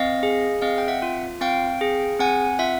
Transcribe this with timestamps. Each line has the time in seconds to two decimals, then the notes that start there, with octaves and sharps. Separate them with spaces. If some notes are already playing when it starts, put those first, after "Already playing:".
Already playing: C4 D#5 F5
0.23 G#4
0.62 C4 D#5 F5
0.78 G5
0.88 E5 F#5
1.02 F4
1.41 C4 F5 G5
1.81 G#4
2.19 C4 F#5 G#5
2.59 F4 E5 F#5